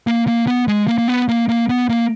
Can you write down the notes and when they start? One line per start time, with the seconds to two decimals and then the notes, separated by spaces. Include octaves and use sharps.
0.07 A#3
0.28 A#3
0.47 B3
0.68 G#3
0.88 A#3
0.98 A#3
1.08 B3
1.29 A#3
1.49 A#3
1.69 B3
1.89 A#3